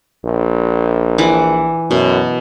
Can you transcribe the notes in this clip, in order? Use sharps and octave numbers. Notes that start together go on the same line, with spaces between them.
A#1
E3 F#5 D6
F#2 B2